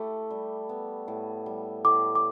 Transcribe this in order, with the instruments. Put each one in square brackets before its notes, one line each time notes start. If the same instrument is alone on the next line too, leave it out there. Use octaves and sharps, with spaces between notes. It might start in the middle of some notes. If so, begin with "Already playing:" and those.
Already playing: [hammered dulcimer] A3 E4 G4
G3
B3
A2
G3
[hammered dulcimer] A2 [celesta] D6
[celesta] D6